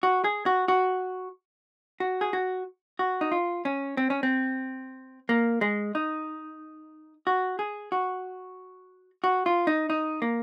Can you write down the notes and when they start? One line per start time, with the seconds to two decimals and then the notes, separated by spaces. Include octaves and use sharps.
0.03 F#4
0.24 G#4
0.46 F#4
0.68 F#4
2.00 F#4
2.21 G#4
2.33 F#4
2.99 F#4
3.21 D#4
3.32 F4
3.65 C#4
3.97 C4
4.10 C#4
4.23 C4
5.29 A#3
5.61 G#3
5.95 D#4
7.27 F#4
7.59 G#4
7.92 F#4
9.24 F#4
9.46 F4
9.67 D#4
9.90 D#4
10.22 A#3